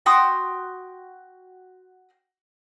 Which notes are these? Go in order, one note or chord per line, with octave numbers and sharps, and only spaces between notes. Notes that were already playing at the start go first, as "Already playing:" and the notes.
F#4 G5 C6 D#6